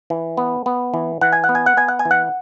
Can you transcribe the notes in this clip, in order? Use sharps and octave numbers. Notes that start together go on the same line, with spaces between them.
E3
B3
B3
E3
E3 F#5
G#5
F#5
B3
G#5
F#5
B3 G#5
F#5
G#5
E3
F#5